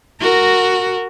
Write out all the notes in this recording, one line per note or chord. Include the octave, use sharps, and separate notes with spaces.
F#4 A#4